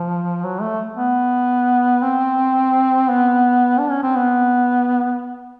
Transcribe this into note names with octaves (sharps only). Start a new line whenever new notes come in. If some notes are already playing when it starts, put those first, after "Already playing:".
Already playing: F3
F#3
A3
B3
C4
B3
D4
C#4
C4
B3